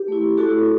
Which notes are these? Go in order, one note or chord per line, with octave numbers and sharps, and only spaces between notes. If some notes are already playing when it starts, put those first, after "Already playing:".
Already playing: G4
A3 E4
A3 E4 F#4 A4